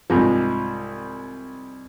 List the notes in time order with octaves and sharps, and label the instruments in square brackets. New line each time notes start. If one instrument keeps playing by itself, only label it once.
[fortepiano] C2 G#2 F3